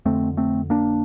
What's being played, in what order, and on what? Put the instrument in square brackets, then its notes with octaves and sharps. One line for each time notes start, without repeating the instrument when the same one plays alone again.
[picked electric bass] F2 D3 A3 C4
A3 C4
A#3 D4